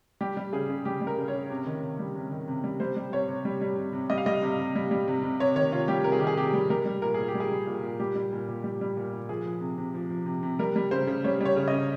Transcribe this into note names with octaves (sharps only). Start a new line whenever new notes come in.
G3 G4
G3
C#3 G#4
C#3
G3 G4
G3
A#4
C#3
C#5
C#3
C3
D#3
C3
G3
C3
D#3
C3
G3
G3 C5
G3
C3 C#5
C3
G3
G3
C3
C3
G3 D#5
F5
G3 D#5
C3
C3
G3
G3
C3
C3
C3 C#5
D#3 C#5
C3 F4
G3 G4
C3 A#4
G#4
D#3 G4
G#4
C3 G4
G3
G3 A#4
G3
A#2 A#4
A#2 G#4
G4
G3
G#4
G3
A#2
A#2
G3 G4
G3
A#2
A#2
G3
G3
A#2
A#2
F3 G#4
F3
C3
C3
F3
F3
C3
C3
G3 A#4
G3
C#3 C5
C#3
G3 C#5
G3 C#5
C#3
C#3 D#5